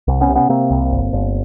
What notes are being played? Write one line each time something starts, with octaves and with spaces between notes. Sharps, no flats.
C2
B3 C#4
C3
B3 C#4
C3 A#3 C4
C2
G1
G1